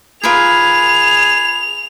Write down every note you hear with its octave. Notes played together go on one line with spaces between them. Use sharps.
F4 G#4 A#4 B4 F7